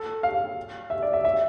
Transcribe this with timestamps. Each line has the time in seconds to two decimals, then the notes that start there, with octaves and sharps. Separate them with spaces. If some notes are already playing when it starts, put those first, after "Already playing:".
Already playing: A4
0.23 F5
0.90 E5
1.02 D5
1.13 E5
1.25 E5